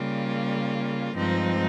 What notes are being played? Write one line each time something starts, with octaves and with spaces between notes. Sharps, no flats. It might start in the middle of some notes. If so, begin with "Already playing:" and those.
Already playing: C#3 G3 A#3 F4
G2 F3 G#3 C4 D#4